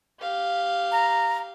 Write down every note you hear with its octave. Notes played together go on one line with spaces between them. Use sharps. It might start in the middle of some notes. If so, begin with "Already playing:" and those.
G4 F5
A#5